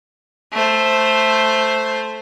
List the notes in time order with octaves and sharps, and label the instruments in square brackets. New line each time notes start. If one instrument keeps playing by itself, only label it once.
[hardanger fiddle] A3 C5